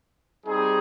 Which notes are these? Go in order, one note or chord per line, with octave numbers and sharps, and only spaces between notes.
G3 C4 D#4 G#4